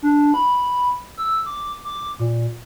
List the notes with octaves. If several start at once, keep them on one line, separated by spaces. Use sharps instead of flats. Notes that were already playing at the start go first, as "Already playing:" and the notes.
D4
B5
E6
D6
D6
A#2